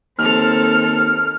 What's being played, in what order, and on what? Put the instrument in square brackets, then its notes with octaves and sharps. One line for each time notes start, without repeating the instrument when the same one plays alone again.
[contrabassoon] D#2 [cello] C4 A4 [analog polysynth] F6